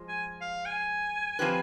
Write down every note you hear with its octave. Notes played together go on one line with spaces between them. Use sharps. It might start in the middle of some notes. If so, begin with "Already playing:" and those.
Already playing: F3 G#3
G#5
F5
G#5
F3 C4 G4 B4